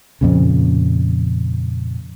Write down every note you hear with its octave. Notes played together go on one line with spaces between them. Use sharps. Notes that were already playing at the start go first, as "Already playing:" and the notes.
F2 A#2 C#3